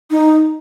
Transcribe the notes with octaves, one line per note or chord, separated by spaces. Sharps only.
D#4